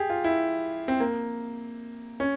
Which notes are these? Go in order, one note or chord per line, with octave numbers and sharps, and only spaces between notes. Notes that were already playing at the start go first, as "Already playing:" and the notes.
Already playing: G4 G#4
F4
E4
C4
A#3
C#4